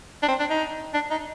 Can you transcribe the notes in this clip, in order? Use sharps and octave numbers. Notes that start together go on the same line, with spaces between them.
D4
C4
D4
D#4
D4
D#4